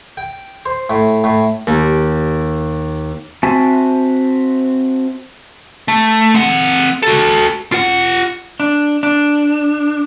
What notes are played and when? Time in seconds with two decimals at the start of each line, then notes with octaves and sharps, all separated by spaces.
0.17 G5
0.66 C5
0.90 A2
1.24 A2
1.67 D#2
3.43 C4 F#4 E5 G#5 A5
5.88 A3
6.34 C4 F#5
7.02 F#4 A4
7.72 F4 F#5
8.60 D4
9.03 D4